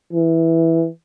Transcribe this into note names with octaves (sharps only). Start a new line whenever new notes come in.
E3